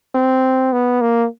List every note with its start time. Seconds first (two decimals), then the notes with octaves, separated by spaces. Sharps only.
0.15 C4
0.73 B3
1.01 A#3